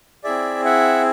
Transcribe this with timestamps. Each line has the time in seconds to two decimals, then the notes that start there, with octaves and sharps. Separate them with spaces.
0.24 C4 E4 G#4 D5 E5
0.65 E5 F#5